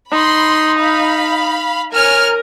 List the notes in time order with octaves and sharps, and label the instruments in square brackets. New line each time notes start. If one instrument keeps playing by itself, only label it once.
[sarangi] D#4 [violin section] B5 C6
[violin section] F5 B5
[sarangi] A#4 [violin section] C#5 G#5 F6